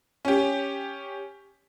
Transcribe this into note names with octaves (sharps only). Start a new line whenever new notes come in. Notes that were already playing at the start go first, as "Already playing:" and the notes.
C#4 G4